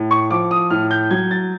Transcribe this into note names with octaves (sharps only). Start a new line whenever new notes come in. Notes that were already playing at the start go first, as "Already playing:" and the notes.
Already playing: A2
C#6
F3 D6
D#6
A2 F6
G6
F#3 G#6
A6